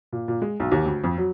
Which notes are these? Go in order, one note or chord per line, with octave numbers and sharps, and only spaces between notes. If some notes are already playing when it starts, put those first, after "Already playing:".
A#2
A#2
G#3
B1
D#2
D2
F2
F#3